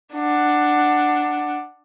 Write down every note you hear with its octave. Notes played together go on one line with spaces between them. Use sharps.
D4 F#5